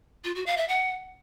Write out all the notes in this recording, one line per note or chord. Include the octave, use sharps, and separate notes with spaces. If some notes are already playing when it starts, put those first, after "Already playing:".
F4
F#4
F5
E5
F#5